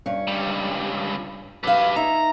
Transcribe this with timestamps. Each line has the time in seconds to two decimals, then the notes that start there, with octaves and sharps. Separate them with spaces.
0.06 G2 C#4
0.27 C#2 G3
1.64 F#2 G4 B4 F5
1.96 D#4 E5 A#5